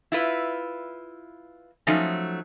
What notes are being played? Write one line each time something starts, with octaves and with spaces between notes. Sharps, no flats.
E4 F4 B4
F3 F#3 A3 C#4 D#4